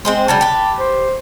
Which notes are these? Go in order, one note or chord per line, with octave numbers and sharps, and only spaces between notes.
G#3 C4 G#4 C5
C#3 F#3 G3 A5
G4 B4
C5